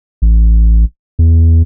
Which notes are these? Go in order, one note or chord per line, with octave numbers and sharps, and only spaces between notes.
A1
E2